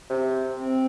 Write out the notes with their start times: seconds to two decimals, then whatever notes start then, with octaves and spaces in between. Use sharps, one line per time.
0.10 C3
0.58 C4